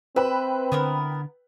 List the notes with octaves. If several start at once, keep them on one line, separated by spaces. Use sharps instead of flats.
C4 B4 E5 G5 B5
D3 B3 E4 A#4